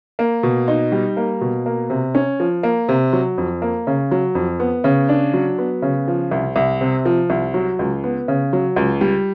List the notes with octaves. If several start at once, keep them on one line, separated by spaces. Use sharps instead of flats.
A#3
B2
D#4
G3
A#3
B2
A#3
C3
C#4
F3
A#3
C3
F#3
F2
A#3
C#3
F#3
F2
B3
C#3
D4
F#3
B3
C#3
F3
C2
C2
C3
F3
C2
F#3
C#2
B3
C#3
F#3
C#2
G3